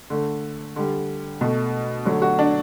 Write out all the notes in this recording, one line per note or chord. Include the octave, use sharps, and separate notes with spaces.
D3 A3
D3 G3
B2 A3
D3 F#3 A3
F#4
D4